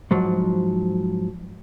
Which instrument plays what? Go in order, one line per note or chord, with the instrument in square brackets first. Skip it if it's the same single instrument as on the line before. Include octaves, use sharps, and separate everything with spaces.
[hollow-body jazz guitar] G#2 F3 F#3